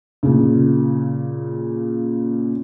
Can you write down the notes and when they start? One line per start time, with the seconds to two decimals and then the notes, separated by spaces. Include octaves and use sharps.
0.23 A#2 C#3